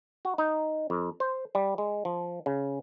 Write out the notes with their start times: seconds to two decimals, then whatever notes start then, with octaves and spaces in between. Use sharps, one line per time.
0.25 F#4
0.38 D#4
0.90 F2
1.20 C5
1.55 G3
1.78 G#3
2.05 F3
2.46 C#3